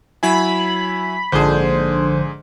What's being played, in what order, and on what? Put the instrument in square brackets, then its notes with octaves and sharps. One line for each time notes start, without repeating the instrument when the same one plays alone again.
[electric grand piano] F#3 E4 G#5 [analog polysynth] B5
[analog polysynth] A#1 D3 C5 [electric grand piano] G#2 G#4